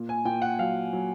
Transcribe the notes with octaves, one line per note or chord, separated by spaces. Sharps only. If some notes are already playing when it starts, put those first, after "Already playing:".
Already playing: A#2
G#5
A#2 G5
F#5
F#3 F5
F#3